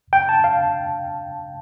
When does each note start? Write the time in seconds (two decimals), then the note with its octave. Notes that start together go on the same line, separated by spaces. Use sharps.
0.13 G5
0.29 A5
0.44 F5